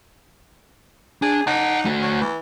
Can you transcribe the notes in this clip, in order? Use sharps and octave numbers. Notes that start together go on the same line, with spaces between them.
D4 G#4
D#4 F#5 A5
A3 F#4
F#3
E3